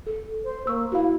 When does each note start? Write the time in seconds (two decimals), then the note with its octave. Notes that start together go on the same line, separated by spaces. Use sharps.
0.07 A4
0.44 C5
0.67 A#3 C#6 E6
0.92 E4 F#4 F5